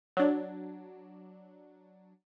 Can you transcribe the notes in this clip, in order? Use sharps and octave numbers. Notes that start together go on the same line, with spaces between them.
F#3 D4